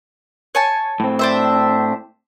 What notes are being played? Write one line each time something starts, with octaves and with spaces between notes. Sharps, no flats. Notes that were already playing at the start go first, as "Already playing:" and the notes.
C#5 G#5 A5
A2 C4
D4 C5 E5